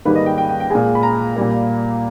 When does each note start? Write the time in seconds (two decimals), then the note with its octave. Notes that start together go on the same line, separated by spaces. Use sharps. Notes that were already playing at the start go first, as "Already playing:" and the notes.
0.05 G#2 D#3 G3 A#3 B4
0.15 D#5
0.26 G5
0.38 G5
0.49 G5
0.60 G5
0.70 A#2 G#3 G#5
0.95 B5
1.03 A#5
1.36 A#2 G3 A#3